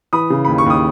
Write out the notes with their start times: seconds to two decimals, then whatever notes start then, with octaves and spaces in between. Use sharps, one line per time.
0.13 E3 B5 D#6
0.30 C#3
0.45 D#2 B5
0.58 C#6
0.66 D#2 D#6